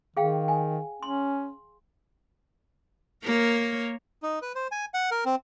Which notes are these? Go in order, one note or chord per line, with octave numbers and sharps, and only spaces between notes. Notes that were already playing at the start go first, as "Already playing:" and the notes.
D#3 G#4 F5 G5
G#5
C#4 C6
A#3 A#4 C#5
D#4
B4
C5
G#5
F#5
A#4
C4